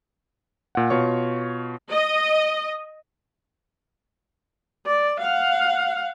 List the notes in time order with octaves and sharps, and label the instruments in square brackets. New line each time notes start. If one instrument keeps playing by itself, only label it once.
[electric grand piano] A#2 F#5
B2 F4 C#5 C#6
[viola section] D#5
[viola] D5
F5 F#5